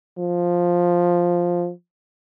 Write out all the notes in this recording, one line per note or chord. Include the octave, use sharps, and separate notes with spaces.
F3